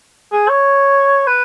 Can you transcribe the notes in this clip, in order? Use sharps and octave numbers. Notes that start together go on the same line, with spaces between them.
G#4
C#5
B4